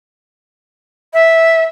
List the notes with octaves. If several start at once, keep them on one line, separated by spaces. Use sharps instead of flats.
E5